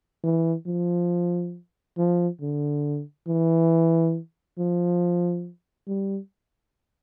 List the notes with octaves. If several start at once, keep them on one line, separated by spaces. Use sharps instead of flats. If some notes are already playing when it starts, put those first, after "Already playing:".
E3
F3
F3
D3
E3
F3
G3